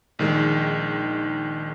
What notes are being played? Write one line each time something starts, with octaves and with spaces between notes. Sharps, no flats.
A#1 D#3 G#3